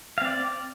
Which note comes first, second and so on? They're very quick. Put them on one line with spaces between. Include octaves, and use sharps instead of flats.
F5 C4 D5